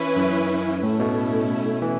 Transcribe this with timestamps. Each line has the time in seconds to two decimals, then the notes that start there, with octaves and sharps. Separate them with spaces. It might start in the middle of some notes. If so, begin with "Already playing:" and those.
Already playing: E3 C#4 E4 B4
0.16 F#2
0.83 A2 A3 C#4 E4
0.99 B2
1.82 E3